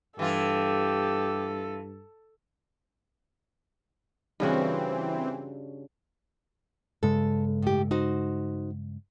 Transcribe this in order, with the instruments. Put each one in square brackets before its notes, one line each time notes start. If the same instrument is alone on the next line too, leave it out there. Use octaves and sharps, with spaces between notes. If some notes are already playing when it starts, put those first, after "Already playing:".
[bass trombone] G2 [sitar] E3 F4 [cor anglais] G4 [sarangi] A4
[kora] G2 C#3 F#4 [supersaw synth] E3 C4
[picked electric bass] G2 C#3 G#3 [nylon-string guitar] A4
[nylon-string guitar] A2 G4
D#4 F#4 C5